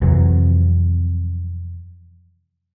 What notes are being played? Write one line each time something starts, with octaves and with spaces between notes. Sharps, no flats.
F2 C3 E3 F#3